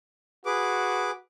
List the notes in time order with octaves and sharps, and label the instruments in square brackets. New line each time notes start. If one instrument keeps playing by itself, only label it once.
[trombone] F#4 [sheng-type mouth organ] G#4 B4 D6